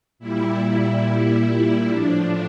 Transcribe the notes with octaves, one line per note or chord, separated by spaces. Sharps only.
A#2 G3 E4
A2 F3 D4